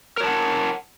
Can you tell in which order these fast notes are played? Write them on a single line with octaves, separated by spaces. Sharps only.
A#4 C#5 A5 F#5